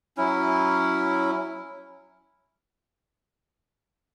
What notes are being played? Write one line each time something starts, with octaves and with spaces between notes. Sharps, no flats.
F#3 C#4 E4